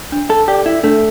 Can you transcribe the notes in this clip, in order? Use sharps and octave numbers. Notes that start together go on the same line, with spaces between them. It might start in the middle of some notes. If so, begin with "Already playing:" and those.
D4
A4
G4 A4 D5
E4
A3 D4